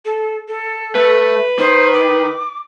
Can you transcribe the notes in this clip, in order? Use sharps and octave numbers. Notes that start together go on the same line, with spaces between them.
A4
A4
A3 B4
D#3 C5
D6